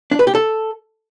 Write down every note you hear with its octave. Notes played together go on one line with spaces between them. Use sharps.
D4
B4
G4
A4